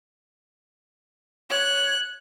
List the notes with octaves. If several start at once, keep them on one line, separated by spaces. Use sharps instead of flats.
C#5 F#6